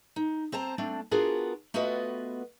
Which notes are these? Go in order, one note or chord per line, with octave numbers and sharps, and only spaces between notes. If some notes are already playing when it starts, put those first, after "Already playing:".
D#4
C4 C5 A5 A#5
A3 C4 D4
B3 D4 F4 F#4 G#4 A#4
A3 B3 F4 F#4 B4 D#5